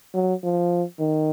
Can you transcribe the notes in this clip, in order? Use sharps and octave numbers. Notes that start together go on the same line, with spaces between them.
F#3
F3
D#3